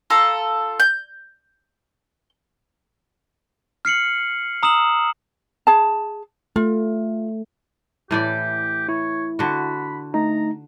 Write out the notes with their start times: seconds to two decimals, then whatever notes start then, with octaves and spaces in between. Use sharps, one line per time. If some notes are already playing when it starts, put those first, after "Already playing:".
0.10 F4 A4 A#5
0.80 G6
3.85 F6 C7 C#7 F#7
4.63 A#5 D#6 E6 E7 F#7
5.67 G#4 A5
6.56 A3 F4
8.11 A2 E3 G4 D5
8.89 E4 C#5
9.39 D3 F#4 B5
10.14 A3 D#4 A#5